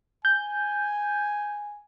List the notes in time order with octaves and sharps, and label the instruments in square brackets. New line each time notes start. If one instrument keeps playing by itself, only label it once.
[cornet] G#5 [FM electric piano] G6